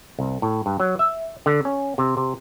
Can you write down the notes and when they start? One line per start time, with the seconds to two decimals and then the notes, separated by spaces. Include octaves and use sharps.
0.19 C2
0.42 A2
0.66 G2
0.80 F#3
0.99 E5
1.46 D3
1.65 C#4
1.98 C3
2.17 C3